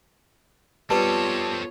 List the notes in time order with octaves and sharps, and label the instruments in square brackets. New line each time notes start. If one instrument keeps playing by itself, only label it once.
[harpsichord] G3 [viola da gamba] B3 F4 C#5 [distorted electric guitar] C4 A4 [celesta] B4 A5